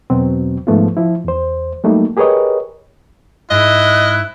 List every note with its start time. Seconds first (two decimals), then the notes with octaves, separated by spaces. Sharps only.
0.10 E2 B2 F#3 C4
0.67 G#2 F3 A3 B3 F4
0.97 F3 E4
1.24 E2 C5
1.84 F#3 G3 A3 A#3 D#4
2.17 G4 G#4 A#4 B4 C#5 D#5
3.51 G#2 E4 D#5 F#6